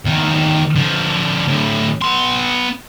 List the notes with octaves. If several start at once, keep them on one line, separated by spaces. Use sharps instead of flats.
E2 D#3
D3 F3
D2 A2
B3 C6